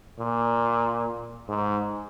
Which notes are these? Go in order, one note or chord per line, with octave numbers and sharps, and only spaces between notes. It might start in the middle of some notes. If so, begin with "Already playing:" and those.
A#2
G#2